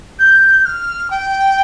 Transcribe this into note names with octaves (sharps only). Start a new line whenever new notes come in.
G6
F6
G5